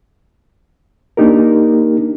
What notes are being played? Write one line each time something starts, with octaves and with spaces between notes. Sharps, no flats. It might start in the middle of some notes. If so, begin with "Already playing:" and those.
A#3 D4 D#4 G4 A#4